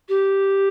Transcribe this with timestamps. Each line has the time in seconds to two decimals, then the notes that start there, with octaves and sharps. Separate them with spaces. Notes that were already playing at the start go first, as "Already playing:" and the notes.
0.08 G4